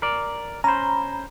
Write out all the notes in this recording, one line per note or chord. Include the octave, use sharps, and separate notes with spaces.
A#4 D5
C#4 C5 A#5 B5